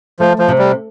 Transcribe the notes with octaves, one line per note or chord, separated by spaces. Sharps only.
F3 A3
F3
C3
G3